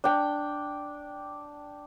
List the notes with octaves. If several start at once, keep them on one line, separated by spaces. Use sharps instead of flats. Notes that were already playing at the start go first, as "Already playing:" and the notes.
D4 G5